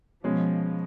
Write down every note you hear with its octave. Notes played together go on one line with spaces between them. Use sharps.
B2 F3 G#3 C#4